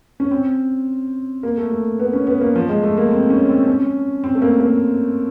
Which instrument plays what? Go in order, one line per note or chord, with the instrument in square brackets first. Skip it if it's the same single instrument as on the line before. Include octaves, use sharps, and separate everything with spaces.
[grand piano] C#4
C4
A#3
A3
A3
B3
C#4
B3
A#3
F3
G#3
A3
A#3
C4
C#4
C4
C#4
C4
A3
A#3
A#3